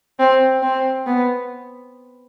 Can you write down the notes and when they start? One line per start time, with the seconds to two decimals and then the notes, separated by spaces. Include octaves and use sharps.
0.20 C4
0.63 C4
1.07 B3